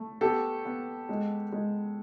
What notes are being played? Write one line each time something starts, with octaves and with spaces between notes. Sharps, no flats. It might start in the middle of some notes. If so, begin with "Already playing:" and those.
Already playing: A3
B3 G4 A4
B3
G#3
G#3